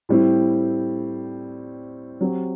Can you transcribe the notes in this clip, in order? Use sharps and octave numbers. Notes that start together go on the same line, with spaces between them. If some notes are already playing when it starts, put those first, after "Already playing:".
A2 G3 C4 E4
F#3 C4 G4